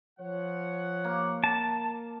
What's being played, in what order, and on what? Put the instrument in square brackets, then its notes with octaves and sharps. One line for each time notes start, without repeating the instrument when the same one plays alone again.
[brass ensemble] F3 C#5 F#5
[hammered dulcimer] A#3
[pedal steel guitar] A5